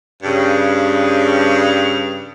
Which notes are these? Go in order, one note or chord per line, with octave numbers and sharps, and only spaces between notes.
G2 C#3